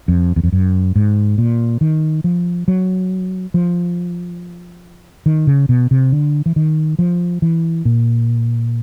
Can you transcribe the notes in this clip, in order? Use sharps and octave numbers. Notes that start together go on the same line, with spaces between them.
F2
E2
F2
F#2
G#2
A#2
D#3
F3
F#3
F3
D#3
C#3
B2
C3
D3
E3
D#3
F3
E3
A#2